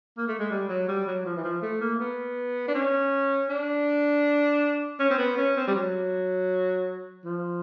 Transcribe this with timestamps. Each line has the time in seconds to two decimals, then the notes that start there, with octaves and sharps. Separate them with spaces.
0.17 A#3
0.28 A3
0.39 G#3
0.50 G3
0.68 F#3
0.88 G3
1.07 F#3
1.25 F3
1.37 E3
1.44 F3
1.62 A3
1.81 A#3
2.00 B3
2.68 D4
2.74 C#4
3.49 D4
4.99 C#4
5.10 C4
5.18 B3
5.37 C#4
5.56 C4
5.67 G3
5.75 F#3
7.24 F3